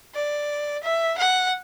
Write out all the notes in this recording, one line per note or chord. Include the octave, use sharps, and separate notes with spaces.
D5
E5
F#5